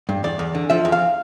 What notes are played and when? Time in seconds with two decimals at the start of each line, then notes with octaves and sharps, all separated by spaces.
0.09 G2
0.24 E2 D5
0.39 E2
0.55 D3
0.70 F3 E5
0.85 E2
0.92 F5